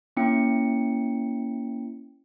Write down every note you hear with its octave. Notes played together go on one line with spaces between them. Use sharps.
A#3 C#4 E4 G5 C#7